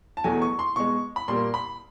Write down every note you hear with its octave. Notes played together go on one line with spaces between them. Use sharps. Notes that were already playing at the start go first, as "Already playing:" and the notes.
A5
E2 B2 F#3 A3 G#5
C#6
C6
B2 G#3 C#6
B5
A#2 G3 A#3 C6
B5